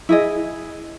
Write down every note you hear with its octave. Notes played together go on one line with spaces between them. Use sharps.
E4 G#4 D#5